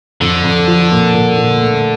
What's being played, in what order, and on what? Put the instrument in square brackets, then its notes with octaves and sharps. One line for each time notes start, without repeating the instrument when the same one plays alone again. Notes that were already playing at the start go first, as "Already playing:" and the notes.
[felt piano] F2 [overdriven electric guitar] D3
[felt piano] F2
F3
A#2
A#2
A#2
A3